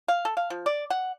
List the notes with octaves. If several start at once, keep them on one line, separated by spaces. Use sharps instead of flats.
F5
A4
F5
F3
D5
F#5